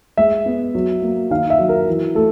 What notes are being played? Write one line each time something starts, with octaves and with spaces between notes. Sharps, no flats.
G#3 E5
B3
F#3
A#3
D#3 F5
E5
F#3
A#4
E3
A3 A4